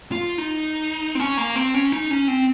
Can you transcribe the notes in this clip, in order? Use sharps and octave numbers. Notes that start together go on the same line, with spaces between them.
F4
D#4
C4
C#4
A#3
C4
C#4
D#4
C#4
C4